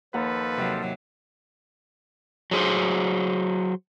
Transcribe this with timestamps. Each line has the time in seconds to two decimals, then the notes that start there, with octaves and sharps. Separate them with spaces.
0.14 D#2 F3 A4 B4 F#5 A#5
0.54 C3 F#3
2.51 F#3 G#4 C5